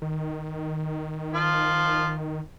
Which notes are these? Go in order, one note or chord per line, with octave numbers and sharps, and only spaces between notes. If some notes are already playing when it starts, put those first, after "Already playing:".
D#3
F3 F4